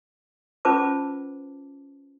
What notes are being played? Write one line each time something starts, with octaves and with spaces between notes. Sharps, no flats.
C#4 F4 B4 C5 A5 D6